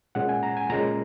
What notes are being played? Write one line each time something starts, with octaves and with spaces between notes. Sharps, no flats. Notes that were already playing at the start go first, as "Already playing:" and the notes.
A#2 G#3 C#4 F#5
G#5
A#5
G#5
A#2 G#3 C#4 A#5